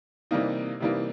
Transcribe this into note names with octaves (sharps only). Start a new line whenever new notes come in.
C3 E3 G3 A#3 D#4
C3 E3 G3 A#3 D#4